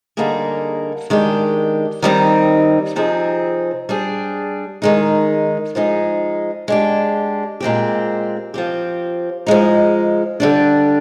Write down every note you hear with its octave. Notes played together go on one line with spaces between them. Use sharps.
D3 G3 A#3 D#4 G#4
D#3 G#3 D4 G4
D#3 G3 C4 D#4
C3 F3 C4 D#4 G#4
G3 D4 G#4
D#3 G#3 D#4
F3 G#3 D#4 G#4
G#3 D4 G4
A#2 G#3 C4 G4
F3 C4 G4
F3 G#3 D#4
D3 G3 D4